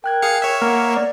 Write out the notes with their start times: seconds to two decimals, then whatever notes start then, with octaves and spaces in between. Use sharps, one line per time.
0.04 A#4 G5 F#6 G#6
0.22 G#4 F5 C#7
0.42 C#5 E5
0.61 A#3 F#5 F6
0.96 D5 F6